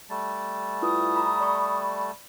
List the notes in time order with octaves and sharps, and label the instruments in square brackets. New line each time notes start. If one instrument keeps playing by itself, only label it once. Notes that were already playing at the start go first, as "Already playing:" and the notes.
[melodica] G3 A3 A5
[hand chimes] E4 F4 B4 [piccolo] D#6
[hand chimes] A#5 B5
D5 B5 C#6